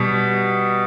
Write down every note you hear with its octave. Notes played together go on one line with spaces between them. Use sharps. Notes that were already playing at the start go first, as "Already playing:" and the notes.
Already playing: B2 G3